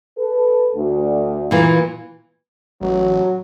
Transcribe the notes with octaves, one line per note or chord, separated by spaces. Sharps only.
A4 B4
D2
A#2 E3 A#3
A1 F#3